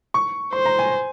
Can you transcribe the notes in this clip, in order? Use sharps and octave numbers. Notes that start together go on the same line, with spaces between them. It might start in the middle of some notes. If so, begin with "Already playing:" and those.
C#6
C5 C6
A#5
G#5